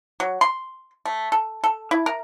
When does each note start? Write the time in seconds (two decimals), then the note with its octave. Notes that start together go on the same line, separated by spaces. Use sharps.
0.20 F#3
0.41 C6
1.06 A3
1.32 A4
1.64 A4
1.91 E4
2.06 A#4